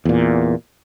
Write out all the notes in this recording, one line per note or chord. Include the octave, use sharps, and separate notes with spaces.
E2 A#2